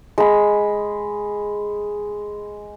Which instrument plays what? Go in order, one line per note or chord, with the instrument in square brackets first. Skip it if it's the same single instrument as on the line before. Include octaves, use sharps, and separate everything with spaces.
[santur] G#3 B5